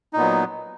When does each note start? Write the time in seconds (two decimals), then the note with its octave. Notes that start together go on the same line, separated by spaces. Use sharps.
0.13 D#4
0.16 A#2
0.19 B3
0.22 F#3